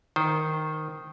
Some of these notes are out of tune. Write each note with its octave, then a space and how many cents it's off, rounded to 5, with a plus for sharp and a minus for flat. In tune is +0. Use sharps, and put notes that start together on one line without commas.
D#3 +0 C5 -10